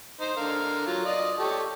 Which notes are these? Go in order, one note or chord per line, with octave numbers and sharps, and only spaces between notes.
D#4 C5
D3 A#4 F5
F#3 F4
F4 D5 D#5
G4 A4 C#5